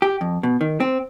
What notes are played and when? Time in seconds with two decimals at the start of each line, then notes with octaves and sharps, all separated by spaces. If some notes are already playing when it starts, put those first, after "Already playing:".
0.02 G4
0.21 F2
0.43 B2
0.61 D#3
0.80 C4